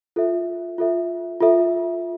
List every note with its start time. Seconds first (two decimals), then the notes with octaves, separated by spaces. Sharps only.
0.16 F4 A4 E5
0.78 F4 A4 E5
1.40 F4 A4 E5